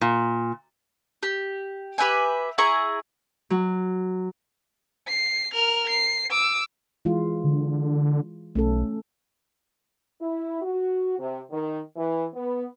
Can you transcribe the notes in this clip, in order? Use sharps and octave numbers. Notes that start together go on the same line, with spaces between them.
A#2
G4
G4 B4 E5 G#5
E4 G#4 A#5 C#6
F#3
C7
A#4 F6
C7
D6 E6
E3 G#3 F4
D3
B1 A3 C#4 A4
E4
F#4
C3
D#3
E3
B3